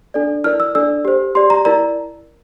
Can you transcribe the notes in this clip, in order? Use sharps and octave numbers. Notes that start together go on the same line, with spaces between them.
D4 A4 D5
E4 A#4 D5 F6
E6
D4 A4 D5 E6
G4 C5
G4 D5 C6
A#5
E4 A#4 D5 A#5